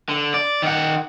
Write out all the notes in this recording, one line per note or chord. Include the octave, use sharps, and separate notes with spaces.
D3
D5
D#3 F#5